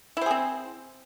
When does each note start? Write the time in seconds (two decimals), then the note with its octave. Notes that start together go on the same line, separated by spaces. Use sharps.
0.17 E4
0.21 C5
0.26 G#4
0.31 C4